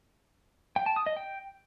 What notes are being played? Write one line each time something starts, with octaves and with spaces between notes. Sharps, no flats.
G5
A5
D#6
D#5
G5